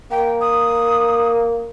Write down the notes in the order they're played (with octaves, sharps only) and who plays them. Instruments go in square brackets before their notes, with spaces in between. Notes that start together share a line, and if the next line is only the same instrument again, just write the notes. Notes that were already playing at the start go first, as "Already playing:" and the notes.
[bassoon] A#3 [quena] G5
[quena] D#6